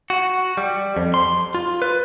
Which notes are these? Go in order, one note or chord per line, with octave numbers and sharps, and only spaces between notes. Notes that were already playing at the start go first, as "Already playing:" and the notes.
F#4
G3
F2
C6
F4
B4